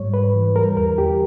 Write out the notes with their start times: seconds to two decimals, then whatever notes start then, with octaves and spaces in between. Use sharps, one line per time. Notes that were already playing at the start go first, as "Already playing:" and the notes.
Already playing: G#2 G3 C#5
0.14 G#2 B4
0.35 E3
0.56 G3 A#4
0.77 E2 A#4
0.98 E2 G4